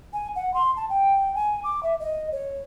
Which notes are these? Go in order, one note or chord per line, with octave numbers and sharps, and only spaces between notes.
G#5
F#5
C6
A5
G5
G#5
D6
E5
D#5
C#5